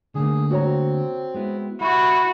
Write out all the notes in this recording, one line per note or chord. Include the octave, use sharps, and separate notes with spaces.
D3 A3 A#3 G#4
C4 F#4 C#5 A#5
G#3 B3 E4
G3 E4 F#4